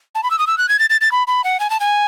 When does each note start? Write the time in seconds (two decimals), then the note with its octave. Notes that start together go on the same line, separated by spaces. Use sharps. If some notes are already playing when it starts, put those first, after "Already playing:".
0.15 A5
0.23 B5
0.31 E6
0.39 D#6
0.47 E6
0.58 F#6
0.69 G#6
0.79 A6
0.90 A6
1.01 A6
1.12 B5
1.27 B5
1.44 F#5
1.60 G#5
1.70 A5
1.80 G#5